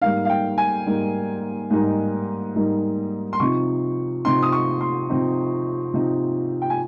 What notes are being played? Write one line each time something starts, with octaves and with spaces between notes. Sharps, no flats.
G#2 G3 A#3 D#4 F5
F5
G5
G#5
G#2 G3 A#3 D#4
G#2 G3 A#3 D#4
G#2 G3 A#3 D#4
C6
C3 F3 C4 D#4 C#6
C3 F3 C4 D#4 C6
D#6
C#6
C6
C3 F3 C4 D#4
C3 F3 C4 D#4
G5
G#5